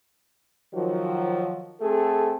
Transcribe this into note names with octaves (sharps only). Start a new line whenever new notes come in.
D#3 F3 F#3
A3 C4 G#4 A4